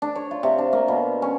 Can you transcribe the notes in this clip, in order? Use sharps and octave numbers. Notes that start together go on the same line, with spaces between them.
D4
C#5
F4
C3
D4
A#3
B2
C#4